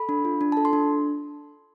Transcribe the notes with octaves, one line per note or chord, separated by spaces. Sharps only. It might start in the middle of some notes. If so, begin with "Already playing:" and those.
Already playing: A4 B5
D4
F4
D4
A4 A5
C6
D4